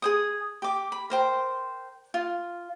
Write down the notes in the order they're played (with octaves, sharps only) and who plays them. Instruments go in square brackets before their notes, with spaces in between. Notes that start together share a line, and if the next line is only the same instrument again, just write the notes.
[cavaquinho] G#4 C5 D#6
G4 D6
B5
A#4 C5 G5
F4